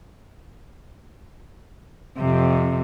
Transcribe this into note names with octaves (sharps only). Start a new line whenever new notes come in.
F2 C3